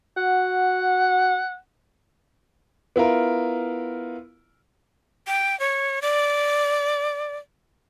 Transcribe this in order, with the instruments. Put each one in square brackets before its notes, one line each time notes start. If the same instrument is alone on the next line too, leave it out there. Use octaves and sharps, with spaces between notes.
[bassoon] F#4 [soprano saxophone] F#5
[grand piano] B3 E4 F4 A#4
[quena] G5
C#5
D5